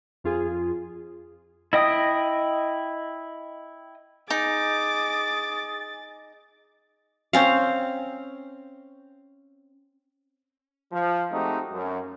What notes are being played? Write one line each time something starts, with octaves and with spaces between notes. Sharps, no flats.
F2 F4 G#4
E4 D#5 G5 D#6
D#4 G#4 D6 A6
C4 C#4 F5
F3
G#3 A3 C4 D#4 F#4 G4
F#2